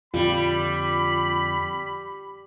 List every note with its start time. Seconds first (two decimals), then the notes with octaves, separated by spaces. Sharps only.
0.14 F2 A#2 D3 G3 F4 B5